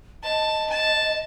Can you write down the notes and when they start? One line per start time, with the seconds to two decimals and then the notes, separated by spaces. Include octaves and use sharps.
0.23 D#5 A5
0.70 A5